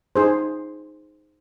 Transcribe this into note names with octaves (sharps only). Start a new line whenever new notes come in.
D#4 G#4 C5